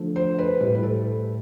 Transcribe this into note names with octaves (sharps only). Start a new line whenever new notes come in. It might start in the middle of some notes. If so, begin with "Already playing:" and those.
Already playing: D3 F3 A3
C5
B4
A2 G3 B4
B4
A4